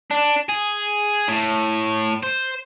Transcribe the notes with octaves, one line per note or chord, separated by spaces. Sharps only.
D4
G#4
A2
C5